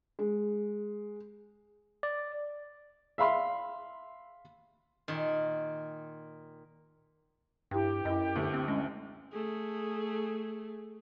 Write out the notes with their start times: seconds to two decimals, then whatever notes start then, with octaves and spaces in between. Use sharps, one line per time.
0.19 G#3
2.03 D5
3.18 E5 F5 B5 C6
5.08 A#2 D#3
7.71 G2 E4 G4 G5
8.05 F#2 E4 D#5
8.35 G1 D2
8.53 C4
8.68 G#3 C#4
9.32 A3 G#4